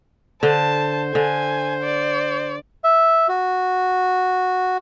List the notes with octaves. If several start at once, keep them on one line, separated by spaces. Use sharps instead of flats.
D3 C5 A5
D3 G#5
D5
E5
F#4